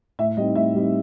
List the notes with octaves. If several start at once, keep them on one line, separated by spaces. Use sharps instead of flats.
A2 E5
G3 C4 D#4 D#5
A2 E5
G3 C4 D#4